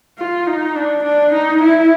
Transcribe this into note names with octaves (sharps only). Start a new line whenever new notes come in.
F4
D#4
D4
D4
D#4
E4